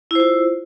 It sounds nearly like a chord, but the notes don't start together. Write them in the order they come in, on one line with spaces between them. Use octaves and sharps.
E4 C5 F4